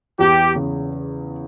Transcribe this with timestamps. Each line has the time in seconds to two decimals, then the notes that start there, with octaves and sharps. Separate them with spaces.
0.19 E2 G4
0.55 C#3